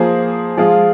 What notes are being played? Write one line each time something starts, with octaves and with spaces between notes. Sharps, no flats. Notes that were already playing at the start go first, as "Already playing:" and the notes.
Already playing: F3 A#3 G#4 C5
F3 G#3 F4 G#4